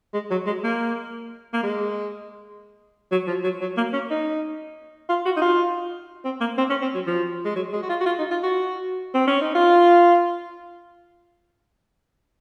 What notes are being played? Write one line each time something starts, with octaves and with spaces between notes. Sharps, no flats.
G#3
F#3
G#3
A#3
A#3
G#3
F#3
F3
F#3
F#3
A#3
C#4
D#4
F4
F#4
D#4
F4
C4
A#3
C4
C#4
C4
F#3
F3
G#3
F#3
G#3
F#4
F4
F#4
F4
D#4
F4
F#4
C4
C#4
D#4
F4